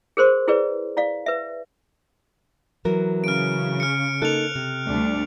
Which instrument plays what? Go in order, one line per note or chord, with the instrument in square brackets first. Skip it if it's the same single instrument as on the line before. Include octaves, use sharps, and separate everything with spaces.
[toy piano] G#4 A#4 C5 C6 C#6
E4 G#4 B4 D5
E4 D5 F5
B4 E5
[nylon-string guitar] E3 F#3 A#4
[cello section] C#3 [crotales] F6 D7
[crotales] F6 C#7
[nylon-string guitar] A#3 D#4 A4 [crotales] F#6 F7
[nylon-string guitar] C3
[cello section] D2 G3 D4